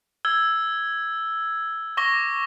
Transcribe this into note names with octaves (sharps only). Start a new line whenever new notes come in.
E6 G#6 G7
C#6 D6 A#6 G7